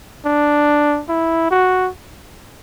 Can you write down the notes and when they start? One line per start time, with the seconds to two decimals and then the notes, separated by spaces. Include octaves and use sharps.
0.25 D4
1.09 E4
1.51 F#4